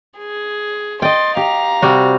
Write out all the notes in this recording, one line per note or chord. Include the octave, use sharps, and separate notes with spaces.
G#4
D#5 G5 C6 A6
G4 F5 A#5
C3 G3 F#4